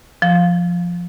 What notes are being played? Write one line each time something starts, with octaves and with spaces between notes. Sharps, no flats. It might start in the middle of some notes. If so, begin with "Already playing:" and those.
F3